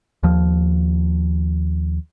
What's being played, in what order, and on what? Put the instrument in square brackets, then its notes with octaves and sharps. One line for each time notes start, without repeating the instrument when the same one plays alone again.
[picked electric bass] D#2 F3